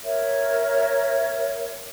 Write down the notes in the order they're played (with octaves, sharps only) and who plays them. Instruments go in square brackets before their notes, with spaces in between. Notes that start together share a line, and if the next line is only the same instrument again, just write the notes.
[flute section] A#4 C#5 E5